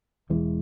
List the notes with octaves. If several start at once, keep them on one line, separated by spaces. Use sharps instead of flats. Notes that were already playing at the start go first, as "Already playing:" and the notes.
E1 E2 E3 G#3